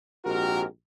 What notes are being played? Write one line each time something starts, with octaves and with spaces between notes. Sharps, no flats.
A#1 G#2 C4 F#4 G4 A#4